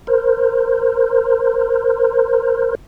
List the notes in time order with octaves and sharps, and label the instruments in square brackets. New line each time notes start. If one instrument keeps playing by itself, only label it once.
[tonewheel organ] A#4 C5